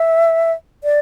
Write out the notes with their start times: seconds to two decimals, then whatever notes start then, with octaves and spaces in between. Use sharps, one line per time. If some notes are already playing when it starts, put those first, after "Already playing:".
Already playing: E5
0.84 D5